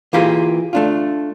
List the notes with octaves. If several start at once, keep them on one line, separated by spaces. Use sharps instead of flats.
E3 A#3 F4 G4 G#4 A#4
A3 D4 F4